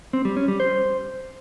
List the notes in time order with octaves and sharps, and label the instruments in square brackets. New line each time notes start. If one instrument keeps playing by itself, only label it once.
[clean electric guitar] C4
G3
C#4
G3
C5